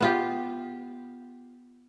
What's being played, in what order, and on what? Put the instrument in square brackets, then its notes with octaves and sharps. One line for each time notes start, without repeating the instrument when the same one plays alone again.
[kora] B3 F4 G4